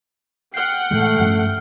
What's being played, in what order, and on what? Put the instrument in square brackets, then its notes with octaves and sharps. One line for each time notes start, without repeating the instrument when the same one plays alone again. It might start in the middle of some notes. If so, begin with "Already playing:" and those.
[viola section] F#5 G5 [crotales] F6 C7
[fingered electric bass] A2 E3 G#3 [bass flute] A3
[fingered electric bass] G2 F3 C#4